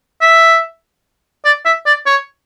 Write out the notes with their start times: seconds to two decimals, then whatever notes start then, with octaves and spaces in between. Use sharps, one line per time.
0.22 E5
1.45 D5
1.66 E5
1.86 D5
2.06 C#5